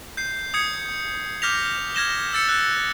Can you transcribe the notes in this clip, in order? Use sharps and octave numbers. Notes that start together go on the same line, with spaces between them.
G6 C7
D#6 G#6 C#7
D6 F6 G6 A#6 B6 F7
F6 G#6 A#6 E7 G7
E6 A6 C#7
F#6 C#7